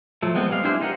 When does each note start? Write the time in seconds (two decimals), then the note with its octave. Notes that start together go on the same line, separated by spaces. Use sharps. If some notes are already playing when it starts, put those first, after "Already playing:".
0.22 F3 F#3 A3
0.35 G#3 B3 C4
0.49 G3 G#3 F5
0.64 D4 E4 G4 G#4 C5
0.81 D#4 G4 A#4 F#5